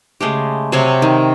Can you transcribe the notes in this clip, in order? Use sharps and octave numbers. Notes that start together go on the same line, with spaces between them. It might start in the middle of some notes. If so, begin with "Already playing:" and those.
C#3 G#3 A3 G4
C3 F#3 C#5 G#5
D#3